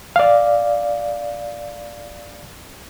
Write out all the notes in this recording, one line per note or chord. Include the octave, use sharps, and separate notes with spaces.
D5 F5